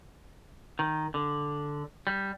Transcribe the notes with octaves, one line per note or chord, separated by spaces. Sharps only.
D#3
D3
G3